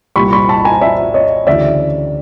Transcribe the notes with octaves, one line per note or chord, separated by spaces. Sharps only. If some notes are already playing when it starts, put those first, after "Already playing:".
C2 A#2 G3 B5 C#6
B5 C#6
A5 B5
G#5 A#5
D5 E5
C#5 D#5
D2 C#3 E3 D5 E5